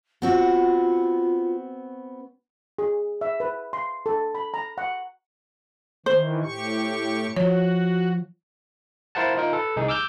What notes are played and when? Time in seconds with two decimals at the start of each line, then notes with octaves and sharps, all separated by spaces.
0.22 B3 C4 F4 F#4
2.79 G#4
3.21 E5
3.40 B4
3.73 C6
4.06 A4
4.35 B5
4.54 A#5
4.78 F#5
6.06 D#3 E3 C5
6.42 A2 G4 C#6
7.37 F3 F#4 C#5
9.15 E4 A#4 C5 F5 F#5 A5
9.37 D#4 F4 A#4
9.53 A4 B4
9.76 C2 D#4 G#4
9.88 D6 E6 F6 G6